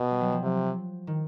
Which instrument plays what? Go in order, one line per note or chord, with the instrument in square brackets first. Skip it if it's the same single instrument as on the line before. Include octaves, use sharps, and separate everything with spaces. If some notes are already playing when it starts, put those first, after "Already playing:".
Already playing: [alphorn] B2
[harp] G3
F#3
F3
[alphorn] C3
[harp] D#3